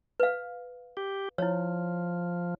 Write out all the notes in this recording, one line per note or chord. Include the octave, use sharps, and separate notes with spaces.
B4 F5
G4
F3 E4 C#5